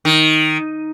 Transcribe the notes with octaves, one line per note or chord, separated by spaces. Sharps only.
D#3